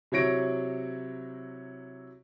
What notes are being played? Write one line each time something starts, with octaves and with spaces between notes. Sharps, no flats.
C3 F#3 E4 C#5 A#6 D7